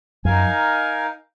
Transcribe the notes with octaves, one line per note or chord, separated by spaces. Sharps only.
F#2 D#4 A#4 F5 G#5